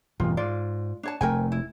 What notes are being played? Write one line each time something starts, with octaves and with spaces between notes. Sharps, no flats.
E1 A1 G2 F4
G#2 F4 D5
D4 C#5 A5
F1 A3 A#4 G5 G#5
E4